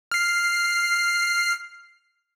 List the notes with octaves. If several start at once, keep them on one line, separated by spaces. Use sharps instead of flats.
F6 C7